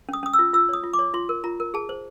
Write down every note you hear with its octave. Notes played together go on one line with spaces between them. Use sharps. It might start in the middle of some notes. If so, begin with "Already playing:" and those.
C#4 D#6
C#4 D#6
E6
F4
F4 E6
C#5 D#6
F4
D6
C#5
F4 C6
A#4
F4 A#5
A#4
G#4 A5
C5